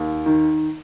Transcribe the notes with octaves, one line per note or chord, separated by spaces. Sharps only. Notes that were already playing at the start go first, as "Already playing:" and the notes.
Already playing: D#2
D#3